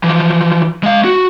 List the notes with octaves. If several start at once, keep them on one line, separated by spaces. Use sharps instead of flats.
E3 F3
G#3 F5
F#4